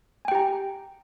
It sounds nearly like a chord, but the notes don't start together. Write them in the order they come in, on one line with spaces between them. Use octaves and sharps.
G#5 G5 G4 A#5